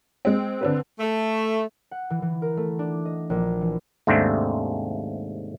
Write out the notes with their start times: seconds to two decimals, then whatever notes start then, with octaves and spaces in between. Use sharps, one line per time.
0.25 G#3 C4
0.61 D3 C4 B4
1.00 A3
1.91 F#5
2.10 E3
2.22 E3
2.42 A#4
2.57 A3
2.79 D4
3.05 D#5
3.30 A#1
3.61 E3
4.07 D#2 G#2 C3 A3 C4 D4